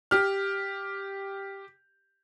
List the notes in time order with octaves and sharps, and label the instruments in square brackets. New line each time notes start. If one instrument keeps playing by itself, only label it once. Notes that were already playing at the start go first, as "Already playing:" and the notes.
[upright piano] G4 F6